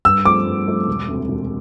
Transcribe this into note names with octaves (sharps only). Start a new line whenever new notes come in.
G2 E6
F3 A3 C4 D6
G2
F3 A3 C4
E1
D2 C3
E1